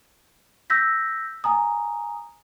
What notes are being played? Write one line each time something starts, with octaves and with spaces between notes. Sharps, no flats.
E6 G6 A#6 B6
G#5 A#5 D#6